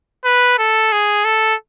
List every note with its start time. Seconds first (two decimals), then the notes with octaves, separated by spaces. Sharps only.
0.25 B4
0.59 A4
0.92 G#4
1.25 A4